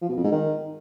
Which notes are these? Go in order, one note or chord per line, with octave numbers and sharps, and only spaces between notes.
F3
B2
F2
G#2
D#3